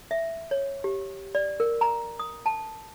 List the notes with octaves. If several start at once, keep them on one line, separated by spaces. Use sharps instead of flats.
E5
C#5
G4
D5
A#4
A#5
D#6
A5